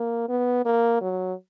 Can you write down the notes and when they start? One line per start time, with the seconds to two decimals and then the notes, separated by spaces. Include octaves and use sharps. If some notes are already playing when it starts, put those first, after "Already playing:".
Already playing: A#3
0.29 B3
0.65 A#3
1.01 F#3